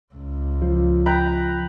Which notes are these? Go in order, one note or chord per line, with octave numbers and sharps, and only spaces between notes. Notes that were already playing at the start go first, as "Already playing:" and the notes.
C#2
F3
B4 G5 A#5